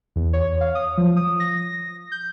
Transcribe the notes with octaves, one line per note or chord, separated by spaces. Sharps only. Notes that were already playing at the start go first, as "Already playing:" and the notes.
E2
C#5
F5
D#6
F3
D#6
A#6
G6